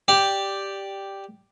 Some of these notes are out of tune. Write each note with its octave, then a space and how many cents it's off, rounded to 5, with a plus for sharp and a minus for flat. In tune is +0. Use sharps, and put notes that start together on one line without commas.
G4 +0 D5 +0